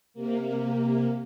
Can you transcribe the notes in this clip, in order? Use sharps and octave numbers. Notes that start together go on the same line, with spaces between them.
C3 A#3